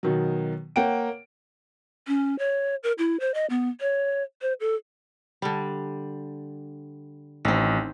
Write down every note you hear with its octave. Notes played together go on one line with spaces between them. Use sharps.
B2 D#3 F#3
A#3 C#5 F#5 G5 D7
C#4
C#5
A#4
E4
C5
D#5
B3
C#5
C5
A4
D3 G3
A1 D#3 C4